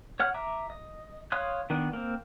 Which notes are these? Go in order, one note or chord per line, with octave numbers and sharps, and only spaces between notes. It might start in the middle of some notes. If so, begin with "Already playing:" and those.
C#5 F#5 F6 F#6
E5 A#5 D6
D#5
C#5 F5 C6 D#6 F#6
D#3 B3 D4
A#3 C4